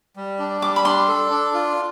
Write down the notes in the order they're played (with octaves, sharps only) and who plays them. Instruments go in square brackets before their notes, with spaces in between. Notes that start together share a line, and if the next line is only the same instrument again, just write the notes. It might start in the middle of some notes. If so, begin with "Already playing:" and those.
[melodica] G3
D4
[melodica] G3 [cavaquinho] D6
[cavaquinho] B5
[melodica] D4 [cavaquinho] C6
[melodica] A4
D4
F4